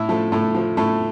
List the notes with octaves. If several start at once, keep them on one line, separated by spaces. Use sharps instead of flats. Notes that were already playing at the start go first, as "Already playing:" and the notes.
Already playing: A2 E4
F3 A3
A2 A3
F3
A2 A3